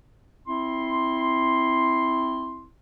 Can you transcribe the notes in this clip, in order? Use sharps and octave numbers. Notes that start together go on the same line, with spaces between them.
C4 E4 C6